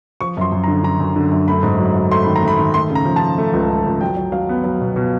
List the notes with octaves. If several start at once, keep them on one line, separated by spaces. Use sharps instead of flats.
F3 C#6
F#2 C6
F#2
A#5
D3
D3 A#5
F#2
D3
F#2
A3 B5
G#2
F#3
F#3
A3 C6
D#3 B5
A#5
A3
B5
D#3
A3 C6
C#3
A#5
F3
A5
C#3
A3
C#2
A3
C#2
F#3 G5
F#3
F#3 F5
B3
F#3
B2
B2